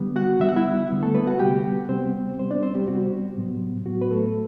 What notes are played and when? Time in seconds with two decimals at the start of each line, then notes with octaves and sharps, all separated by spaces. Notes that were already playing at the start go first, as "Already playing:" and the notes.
Already playing: D3 G3 B3
0.16 F#4 F#5
0.40 D3 G3 B3 E5
0.49 F#5
0.56 E4 E5
0.91 D3 G3 B3
1.03 A3 A4
1.15 B3 B4
1.27 F#4 F#5
1.39 C3 G3 B3 G4 G5
1.89 C3 G3 B3 C4 C5
2.38 C3 G3 B3 C5
2.51 D4 D5
2.63 C4 C5
2.75 G3 G4
2.87 C3 G3 B3 F#4
3.37 A2 F#3 B3
3.86 A2 F#3 B3 F#4
4.01 B4
4.11 A3 A4